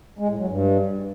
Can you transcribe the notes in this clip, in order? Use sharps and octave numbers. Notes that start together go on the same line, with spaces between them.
G#3
A2
F#3
G2